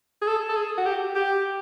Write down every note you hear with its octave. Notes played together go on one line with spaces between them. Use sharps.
G#4
A4
A4
G#4
F#4
G4
G4